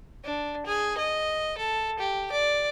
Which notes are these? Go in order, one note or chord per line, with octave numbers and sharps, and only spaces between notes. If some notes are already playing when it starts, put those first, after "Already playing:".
D4
G#4
D#5
A4
G4
D5